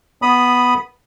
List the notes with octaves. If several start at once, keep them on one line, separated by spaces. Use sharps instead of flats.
B3 B5 D#6